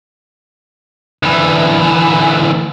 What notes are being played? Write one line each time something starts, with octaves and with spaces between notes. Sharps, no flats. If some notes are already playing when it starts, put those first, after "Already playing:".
D2 E3